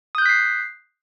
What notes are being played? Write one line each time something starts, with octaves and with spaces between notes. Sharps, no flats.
D#6 F#6 G6 B6 C7